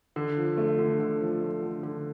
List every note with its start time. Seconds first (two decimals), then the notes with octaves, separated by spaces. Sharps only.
0.16 D3
0.37 F3
0.58 A3
0.79 D3
0.99 D3
1.21 F3
1.41 A3
1.62 D3
1.83 D3